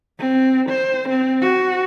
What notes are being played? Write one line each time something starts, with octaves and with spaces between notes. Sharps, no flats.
C4
C5
C4
F#4